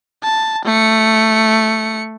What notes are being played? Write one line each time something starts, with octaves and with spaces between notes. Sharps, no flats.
A5
A3 C#7